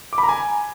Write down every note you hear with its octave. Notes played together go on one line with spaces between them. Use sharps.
D6
B5
A#5
G#5